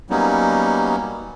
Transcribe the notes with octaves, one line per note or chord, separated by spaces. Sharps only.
F#3 G3 A#3 B3 C#4 D#4